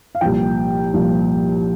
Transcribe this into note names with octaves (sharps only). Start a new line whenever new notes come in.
F5
C2 A#2 F3 G5
C2 A#2 F3